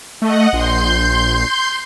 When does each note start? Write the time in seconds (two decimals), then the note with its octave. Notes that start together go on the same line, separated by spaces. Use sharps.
0.22 A3 D#5 F#5
0.53 A#1 C6 G6